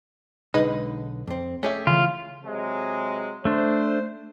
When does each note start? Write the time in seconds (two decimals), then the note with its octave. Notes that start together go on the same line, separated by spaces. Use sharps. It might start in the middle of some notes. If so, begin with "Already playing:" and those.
0.54 B1 D3 G#3 D#4 B4 D#5
1.27 F2 C4
1.63 A3 C#4 G4 G#4 E5
1.87 C#3 E3 F4
2.44 C3 F#3 G#3
3.45 A3 D4 C5